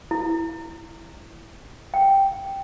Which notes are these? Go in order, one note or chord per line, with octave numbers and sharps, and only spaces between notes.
E4
G5